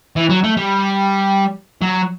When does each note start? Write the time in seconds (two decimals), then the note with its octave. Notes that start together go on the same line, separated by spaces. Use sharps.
0.16 E3
0.30 F#3
0.44 A3
0.57 G3
1.81 F#3